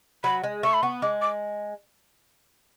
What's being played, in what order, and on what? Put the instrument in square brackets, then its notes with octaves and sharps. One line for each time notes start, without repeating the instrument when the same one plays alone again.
[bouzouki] F#3 [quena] B5
[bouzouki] G#3
[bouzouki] A3 [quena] C#6
[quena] B5
[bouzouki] B3 [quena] C#6
[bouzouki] G#3 [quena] D6
[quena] D6